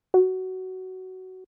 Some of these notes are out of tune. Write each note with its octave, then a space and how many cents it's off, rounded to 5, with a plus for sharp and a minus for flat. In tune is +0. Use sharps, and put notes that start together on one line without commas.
F#4 +15